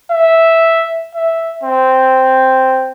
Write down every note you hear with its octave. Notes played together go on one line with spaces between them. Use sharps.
E5
E5
C4